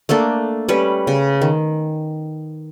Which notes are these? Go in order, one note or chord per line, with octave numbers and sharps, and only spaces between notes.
A3 A#3 D4 A4
G3 C#4 B4
C#3
D#3